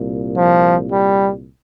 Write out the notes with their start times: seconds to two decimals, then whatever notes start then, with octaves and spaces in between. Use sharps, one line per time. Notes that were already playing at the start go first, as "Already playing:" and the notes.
Already playing: C2 A#2
0.37 F3
0.92 G3